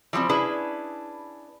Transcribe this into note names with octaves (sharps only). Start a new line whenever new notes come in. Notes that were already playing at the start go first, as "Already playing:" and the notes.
E3 F3 G3 C4
C#4 D4 E4 G#4 B4